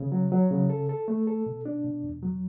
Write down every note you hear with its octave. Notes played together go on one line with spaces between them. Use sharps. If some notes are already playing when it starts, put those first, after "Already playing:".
Already playing: C#3
F#3
F#3
C#3
A4
A4
A3
A4
B2
D4
B2
E2
F#3